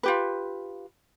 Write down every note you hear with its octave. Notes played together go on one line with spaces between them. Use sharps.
F4 G4 B4